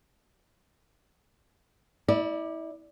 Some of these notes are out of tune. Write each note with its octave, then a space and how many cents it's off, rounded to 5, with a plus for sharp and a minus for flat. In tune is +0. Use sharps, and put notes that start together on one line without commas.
E4 -30 D5 +20